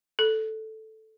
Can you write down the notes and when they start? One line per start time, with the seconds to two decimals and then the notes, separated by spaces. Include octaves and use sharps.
0.19 A4